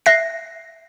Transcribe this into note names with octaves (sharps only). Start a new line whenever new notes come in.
E5 F#6 A#6 C7